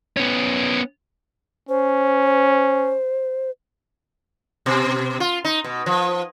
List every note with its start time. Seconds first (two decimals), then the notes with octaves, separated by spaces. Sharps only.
0.17 B3 C#4
1.69 C#4 C5
4.66 B2
5.20 F4
5.45 D#4
5.64 B2
5.86 F3